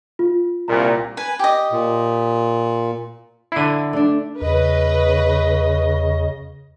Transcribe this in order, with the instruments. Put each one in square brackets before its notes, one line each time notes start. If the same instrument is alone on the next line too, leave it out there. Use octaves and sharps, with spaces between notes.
[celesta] F4
[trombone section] C2 A#2 [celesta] A#5
[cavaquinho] B4 G#5
G4 D#5
[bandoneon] A#2
[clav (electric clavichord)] D3 E4 [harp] C7 D#7
[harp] A3 D4
[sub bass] E2 [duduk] C#3 [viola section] B4 [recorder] D#5